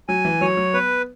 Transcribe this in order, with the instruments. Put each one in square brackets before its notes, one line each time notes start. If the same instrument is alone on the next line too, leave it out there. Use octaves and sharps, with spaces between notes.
[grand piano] F#3 [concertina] G#5
[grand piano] E3
[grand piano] F#3 [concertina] C#5
[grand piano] F#3
[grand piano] B3 [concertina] B4